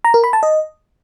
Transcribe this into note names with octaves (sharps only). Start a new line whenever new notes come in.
A#5
A#4
B5
A5
D#5